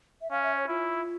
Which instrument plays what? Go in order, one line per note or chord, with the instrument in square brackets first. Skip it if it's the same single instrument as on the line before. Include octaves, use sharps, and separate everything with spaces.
[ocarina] E5
[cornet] C#4 [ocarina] F5
[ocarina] E5
C#5
[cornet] E4 [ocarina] F4